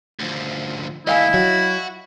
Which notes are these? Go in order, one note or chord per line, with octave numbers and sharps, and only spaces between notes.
D2 F3
D#2 A3 E4 D#5 F5 G#5
F#3 F#4